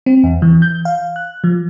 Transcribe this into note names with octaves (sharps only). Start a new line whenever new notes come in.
C4
E2
E3
G6
F5
F#6
F3